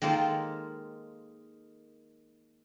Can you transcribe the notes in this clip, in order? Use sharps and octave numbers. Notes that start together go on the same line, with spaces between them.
D#3 G#3 A#3 F4 A4 C5